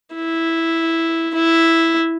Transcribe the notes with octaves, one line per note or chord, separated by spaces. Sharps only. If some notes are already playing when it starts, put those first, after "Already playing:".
E4
E4